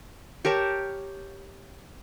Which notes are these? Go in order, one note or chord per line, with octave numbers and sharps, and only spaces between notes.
G4 A#4 C#5 A5